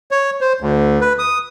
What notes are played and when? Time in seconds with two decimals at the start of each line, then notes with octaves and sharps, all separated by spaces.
0.11 C#5
0.41 C5
0.60 D2
1.01 B4
1.19 D#6